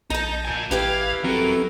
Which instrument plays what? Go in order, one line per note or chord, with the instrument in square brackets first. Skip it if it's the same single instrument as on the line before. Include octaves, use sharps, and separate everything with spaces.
[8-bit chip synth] A#1 G6 [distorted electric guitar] D#4 [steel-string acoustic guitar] A5 A#5
[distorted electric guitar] A#2 G#5
[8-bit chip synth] A1 G#6 [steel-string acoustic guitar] E4 G4 B4 [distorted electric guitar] F5
[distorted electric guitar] F#3 A#4 [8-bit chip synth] C4 A4